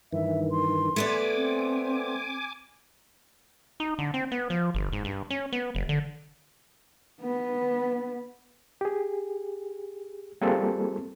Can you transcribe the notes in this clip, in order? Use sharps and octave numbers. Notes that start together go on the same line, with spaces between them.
G2 D#3 E3 E5
C6
A3 B3 D5 G#5 D6
C4
D#4
D3
C4
B3
F3
G1
G#2
G2
C#4
B3
F#1
D3
B3 B4
G4 G#4
G3 A#3 C4 F4 G#4 A4